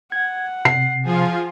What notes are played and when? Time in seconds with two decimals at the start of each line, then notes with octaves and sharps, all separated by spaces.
0.12 F#5 G#6
0.65 C3 C7
1.05 F3 F4 G#4